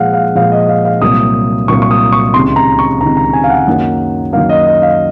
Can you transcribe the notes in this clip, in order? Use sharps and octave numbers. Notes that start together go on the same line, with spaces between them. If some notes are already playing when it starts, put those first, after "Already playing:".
Already playing: A#2 F3 G#3 F5 F#5
F5
A#2 F3 G#3 F5
D#5
F5
F5
C2 A#2 F#3 A#3 D#6
C2 A#2 F#3 A#3 C#6
C#6
D#6
C#6
C#2 C3 D#3 C6
A#5
C#6
C#2 C3 D#3 A#5
A#5
G#5
F5
F#5
F#2 D#3 F#3 A#3
F#2 D#3 F#3 A#3 F5
D#5
D#5
F5